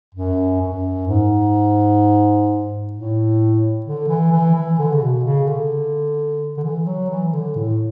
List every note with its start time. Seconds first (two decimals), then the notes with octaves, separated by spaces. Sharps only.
0.15 F#2
0.61 F#2
1.07 G#2
2.93 A2
3.86 D3
4.08 E3
4.32 E3
4.55 E3
4.78 D3
4.92 C#3
5.01 B2
5.24 C#3
5.47 D3
6.57 D3
6.64 E3
6.86 F#3
7.10 E3
7.33 D3
7.56 A2